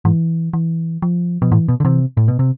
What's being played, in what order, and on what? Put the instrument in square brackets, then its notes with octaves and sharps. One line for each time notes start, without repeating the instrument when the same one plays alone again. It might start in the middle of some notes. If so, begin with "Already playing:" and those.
[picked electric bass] G#2 [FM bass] E3
[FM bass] E3
F3
[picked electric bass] B2 [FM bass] F3
[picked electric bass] A2 [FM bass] E3
[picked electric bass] B2
D3
[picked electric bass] C3 [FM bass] E3
[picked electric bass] A2
B2
C3